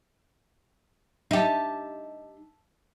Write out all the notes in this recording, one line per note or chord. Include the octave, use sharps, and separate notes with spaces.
D#4 G4 E5 A5